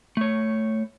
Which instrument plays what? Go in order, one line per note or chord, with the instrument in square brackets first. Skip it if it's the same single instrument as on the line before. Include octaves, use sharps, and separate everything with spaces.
[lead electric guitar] A3 C#5